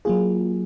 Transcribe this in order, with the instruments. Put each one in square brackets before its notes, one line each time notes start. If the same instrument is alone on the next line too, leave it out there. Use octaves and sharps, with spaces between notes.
[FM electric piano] F#3 A#3 F4 G#4